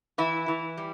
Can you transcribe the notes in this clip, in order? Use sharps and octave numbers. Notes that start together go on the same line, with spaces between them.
E3 E4
E3
G3